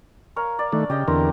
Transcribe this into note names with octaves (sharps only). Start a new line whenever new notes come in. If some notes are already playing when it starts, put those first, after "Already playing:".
A#4 C#5 F5
D5
D#3 A3 D4
C#3 G4 D#5
E2 D3 C4 A#4